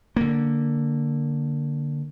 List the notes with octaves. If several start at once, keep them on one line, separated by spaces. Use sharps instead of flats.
D3 A#3